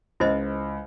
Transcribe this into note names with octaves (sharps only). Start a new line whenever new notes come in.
C#2 E4 C5 D#5